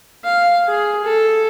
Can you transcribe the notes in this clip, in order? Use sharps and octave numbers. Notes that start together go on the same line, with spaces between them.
F5
G#4
A4